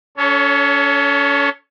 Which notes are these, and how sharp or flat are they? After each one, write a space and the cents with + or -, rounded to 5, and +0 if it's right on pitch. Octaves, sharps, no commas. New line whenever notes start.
C#4 +35 A4 +5 C#5 +0